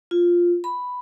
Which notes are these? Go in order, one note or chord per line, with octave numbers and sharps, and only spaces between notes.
F4
B5